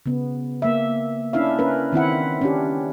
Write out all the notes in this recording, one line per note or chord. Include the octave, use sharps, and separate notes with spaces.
C#3 B3
A#3 E5
C#4 D4 E4 E5 F5
C#4 A#4 B4
D#3 C4 E4 F#5
C#4 D4 G4